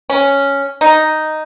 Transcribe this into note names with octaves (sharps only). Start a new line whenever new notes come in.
C#4
D#4